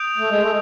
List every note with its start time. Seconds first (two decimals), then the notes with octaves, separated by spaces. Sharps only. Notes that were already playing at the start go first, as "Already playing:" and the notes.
Already playing: D#6 G6 D7 F7
0.18 A3
0.30 G#3
0.41 A3